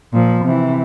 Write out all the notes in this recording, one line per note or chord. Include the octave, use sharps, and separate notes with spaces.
A#2 F3
C3 E3